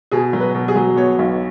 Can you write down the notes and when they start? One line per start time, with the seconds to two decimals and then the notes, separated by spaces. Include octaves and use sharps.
0.11 B2 G#4
0.33 F#3
0.40 B4
0.54 B2
0.68 G#4
0.76 F#3
0.96 B3 C#5
1.19 B1